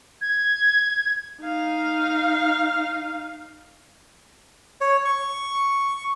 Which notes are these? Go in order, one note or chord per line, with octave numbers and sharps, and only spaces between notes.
G#6
D#4 F5
C#5
C#6